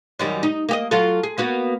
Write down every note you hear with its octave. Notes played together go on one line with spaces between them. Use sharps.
F#2 D#3 G3
D#4
A#3 G4 D#5
F#3 F4 A4
G#4
A#3 B3 F#4